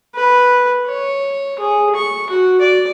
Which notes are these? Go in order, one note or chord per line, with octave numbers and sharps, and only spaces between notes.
B4
C#5
G#4
C#6
F#4
D5